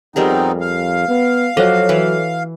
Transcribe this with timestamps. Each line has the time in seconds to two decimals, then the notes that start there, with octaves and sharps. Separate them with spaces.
0.16 F2 G3 B3 C4 D#4 G#4 A#4
0.60 F5
1.08 B3
1.57 F3 F#3 F#4 A4 C#5 D#5
1.89 E3 B4